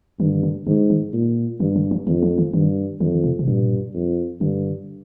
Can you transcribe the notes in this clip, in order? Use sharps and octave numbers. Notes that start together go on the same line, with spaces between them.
G2 D#3
D3
D#3
D3
G#2 D3
D#3
A#2
G2 D#3
D3
F3
F2 D#3
F3
D#3
G2 D#3
F2 D#3
F3
D#3
C3
C3
G2 A#2
F2
G2 D3